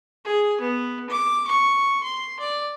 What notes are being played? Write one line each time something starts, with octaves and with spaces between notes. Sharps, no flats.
G#4
B3
D6
C#6
C6
D5